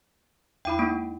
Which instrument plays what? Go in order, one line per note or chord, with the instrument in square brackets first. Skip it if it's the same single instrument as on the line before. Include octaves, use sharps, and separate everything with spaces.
[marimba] E2 E4 B5 [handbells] G5
[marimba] G#3 D#4 E4 [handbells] A#3